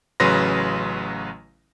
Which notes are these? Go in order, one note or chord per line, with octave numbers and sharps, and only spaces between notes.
A1 C#3 F#3 B4 C6 A#6